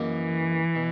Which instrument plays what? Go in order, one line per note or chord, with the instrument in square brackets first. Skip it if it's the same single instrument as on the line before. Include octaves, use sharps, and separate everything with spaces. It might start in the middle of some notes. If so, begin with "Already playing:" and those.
Already playing: [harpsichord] F#2 C#3 F#3 A#3 D#4 [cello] E3
[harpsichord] B2